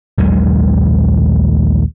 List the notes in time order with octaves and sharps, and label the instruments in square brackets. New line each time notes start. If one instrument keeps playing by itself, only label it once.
[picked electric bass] A#1 D#2 F#3 G#3